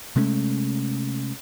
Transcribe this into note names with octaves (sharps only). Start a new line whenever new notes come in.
C3 G#3 A3 C#4